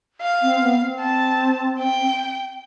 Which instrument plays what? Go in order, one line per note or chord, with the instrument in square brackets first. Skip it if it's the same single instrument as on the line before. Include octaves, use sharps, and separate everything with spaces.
[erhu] F5
[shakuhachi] C4
B3
C4
[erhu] A5
G5